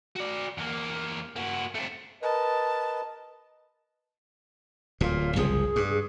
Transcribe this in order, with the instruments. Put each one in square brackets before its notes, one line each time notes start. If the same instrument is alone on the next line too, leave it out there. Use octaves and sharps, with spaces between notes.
[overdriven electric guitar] F#4 D5
E2 A#3
A#3 F#4
A3 C4
[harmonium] A#4 B4 D#5 [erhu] A5
[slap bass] D1 A#2 [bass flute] F4
[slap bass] F#1 C2 F3 [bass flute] G#4
[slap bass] G2